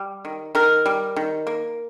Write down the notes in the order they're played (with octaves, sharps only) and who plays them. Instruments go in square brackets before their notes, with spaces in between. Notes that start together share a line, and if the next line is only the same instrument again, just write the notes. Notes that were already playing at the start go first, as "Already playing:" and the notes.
Already playing: [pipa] G3
D#3
D#3 A#4
G3
D#3
A#3